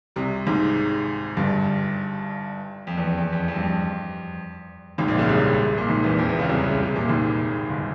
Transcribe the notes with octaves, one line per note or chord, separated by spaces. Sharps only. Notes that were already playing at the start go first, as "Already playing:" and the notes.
C2 C3
G#1 G#2
G1 G2
F2
E2
F2
E2
F2
F2
G2
F2
G#1 G#2
A#1 A#2
C#2 C#3
C2 C3
A#2
G#1 G#2
E2 E3
F2 F3
E2 E3
C#2 C#3
C2 C3
C#3
C3
A#2
G#1 G#2
G1